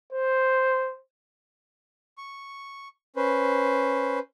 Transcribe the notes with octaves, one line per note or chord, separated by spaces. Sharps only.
C5
C#6
C#4 B4 C5